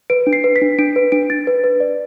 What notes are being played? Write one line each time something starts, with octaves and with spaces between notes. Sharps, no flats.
B4 D7
D4
C7
B4
B6
D4
D4 D7
B4
D4 D7
D4 A6
B4
B4
D5